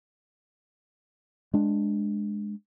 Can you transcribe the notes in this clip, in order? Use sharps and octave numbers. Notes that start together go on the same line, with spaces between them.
G#3 D4